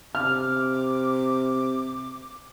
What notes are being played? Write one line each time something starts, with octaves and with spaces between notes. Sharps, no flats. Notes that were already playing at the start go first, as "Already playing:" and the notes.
C3 D6 F6